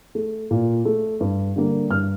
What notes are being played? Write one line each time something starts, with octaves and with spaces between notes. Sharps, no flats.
A3
A#2
A3
G2
D3 G3 A#3
G2 F6